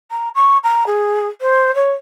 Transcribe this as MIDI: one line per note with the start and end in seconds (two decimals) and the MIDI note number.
0.11 0.29 82
0.35 0.57 85
0.63 0.84 82
0.86 1.28 68
1.41 1.73 72
1.75 1.92 73